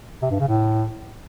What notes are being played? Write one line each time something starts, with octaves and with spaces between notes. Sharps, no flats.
C3
G2
C#3
A2